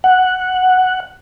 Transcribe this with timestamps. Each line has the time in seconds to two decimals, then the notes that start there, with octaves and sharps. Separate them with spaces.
0.04 F#5